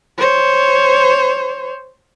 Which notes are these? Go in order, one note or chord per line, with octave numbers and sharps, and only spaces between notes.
C5 C#5